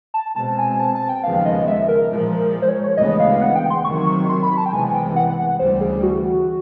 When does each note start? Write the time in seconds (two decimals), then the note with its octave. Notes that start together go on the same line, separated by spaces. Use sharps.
0.14 A5
0.36 B2 G#3 C4 A5
0.58 G#5
0.79 A5
0.95 A5
1.09 G5
1.24 D#2 C#3 F3 G#3 B3 F5
1.45 D#5
1.67 E5
1.89 A#4
2.10 A#2 F3 G#3
2.62 C5
2.69 C#5
2.84 C#5
2.97 D2 C#3 E3 G#3 B3 D#5
3.20 F5
3.41 F#5
3.55 G5
3.70 C6
3.85 C3 D#3 F#3 C#6
4.06 C#6
4.29 C6
4.43 B5
4.57 A5
4.66 G5
4.72 C2 C3 E3 G#3 B3 G#5
4.94 G5
5.16 F#5
5.59 D2 C#3 E3 G3 C5
5.81 G#4
6.03 F#4